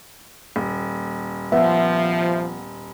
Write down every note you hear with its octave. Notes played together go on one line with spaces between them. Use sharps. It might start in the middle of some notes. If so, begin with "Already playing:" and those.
D#1
F3 B3 E5